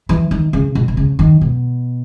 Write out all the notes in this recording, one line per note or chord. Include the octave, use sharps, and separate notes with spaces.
E3
D#3
C#3
B2
B2
C#3
D#3
B2